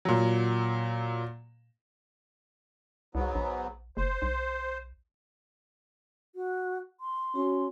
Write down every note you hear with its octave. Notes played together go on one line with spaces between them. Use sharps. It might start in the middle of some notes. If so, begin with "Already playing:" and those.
A#2 F#3
C2 G#2 F#3 B3
A#1
F#1 C5
B1
F#4
C6
C#4 F#4